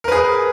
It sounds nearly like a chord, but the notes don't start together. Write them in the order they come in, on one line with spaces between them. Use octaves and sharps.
A#4 B4 G#4